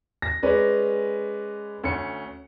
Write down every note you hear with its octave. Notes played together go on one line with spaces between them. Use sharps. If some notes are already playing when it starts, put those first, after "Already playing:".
A#6
G#3 C#4 B4 D5
D2 C#4 C#7